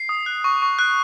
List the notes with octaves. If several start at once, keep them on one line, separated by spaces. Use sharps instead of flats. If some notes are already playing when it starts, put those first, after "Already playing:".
Already playing: C7
D#6
F#6
C#6
C#6
F#6